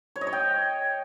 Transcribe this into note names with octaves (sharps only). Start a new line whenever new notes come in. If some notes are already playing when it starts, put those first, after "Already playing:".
C#5
D#5
C#5
G5